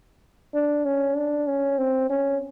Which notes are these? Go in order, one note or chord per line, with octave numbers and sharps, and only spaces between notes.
D4
C#4
D4
C#4
C4
C#4